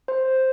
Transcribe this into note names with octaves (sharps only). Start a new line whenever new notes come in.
C5